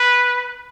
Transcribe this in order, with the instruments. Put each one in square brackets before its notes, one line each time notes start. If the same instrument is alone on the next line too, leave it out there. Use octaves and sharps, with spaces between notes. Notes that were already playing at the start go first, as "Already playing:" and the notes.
Already playing: [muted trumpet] B4